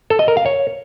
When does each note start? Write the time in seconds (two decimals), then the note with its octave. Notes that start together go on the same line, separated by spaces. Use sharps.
0.10 A4
0.19 D#5
0.28 A#4
0.37 F5
0.46 C#5